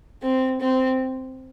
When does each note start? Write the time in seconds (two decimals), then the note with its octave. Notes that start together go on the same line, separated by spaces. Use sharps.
0.22 C4
0.60 C4